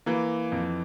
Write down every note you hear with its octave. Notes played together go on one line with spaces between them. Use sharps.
E3 A#3
F2